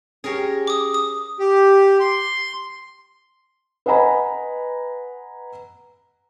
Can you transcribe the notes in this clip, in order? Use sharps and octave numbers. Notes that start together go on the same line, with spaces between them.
C#4 G4 G#4 A#4 C#5
D6 D#6
D#6
G4
C6
B4 D#5 F#5 G#5 A#5 B5